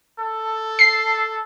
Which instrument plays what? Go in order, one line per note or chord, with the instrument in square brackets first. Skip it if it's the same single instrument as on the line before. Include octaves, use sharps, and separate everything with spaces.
[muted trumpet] A4
[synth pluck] C7